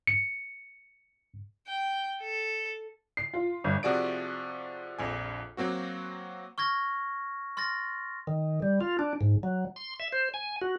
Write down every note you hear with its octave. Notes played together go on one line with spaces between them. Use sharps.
C#7
G5
A4
C7
F4
G1
C3 F3 F#4 G#4 D5 D7
A#1 F2 G#5
F#3 A#3 C4 F#4
C#6 F6 G#6 A#6
C6 F6 A6 A#6
D#3
G3
F4
D4
G#2
F#3
C6
E5
C5
G#5
F#4